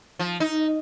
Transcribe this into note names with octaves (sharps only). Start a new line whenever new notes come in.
F3
D#4